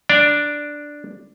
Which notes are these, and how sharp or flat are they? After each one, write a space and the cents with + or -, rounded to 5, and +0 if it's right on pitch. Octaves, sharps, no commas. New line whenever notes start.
D4 +0 D5 +0 A#5 +0